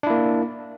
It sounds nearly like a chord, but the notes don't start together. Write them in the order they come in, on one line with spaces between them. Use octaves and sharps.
D4 E4 A#3